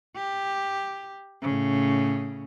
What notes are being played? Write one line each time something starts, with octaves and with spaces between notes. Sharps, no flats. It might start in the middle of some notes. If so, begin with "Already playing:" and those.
G4
A2 C#3